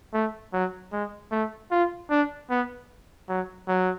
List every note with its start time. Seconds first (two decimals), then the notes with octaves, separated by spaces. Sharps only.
0.14 A3
0.53 F#3
0.92 G#3
1.32 A3
1.71 F4
2.10 D4
2.50 B3
3.29 F#3
3.68 F#3